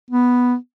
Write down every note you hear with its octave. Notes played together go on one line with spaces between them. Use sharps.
B3